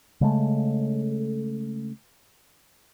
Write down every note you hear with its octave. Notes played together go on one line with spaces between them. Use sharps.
C#3 G#3 A3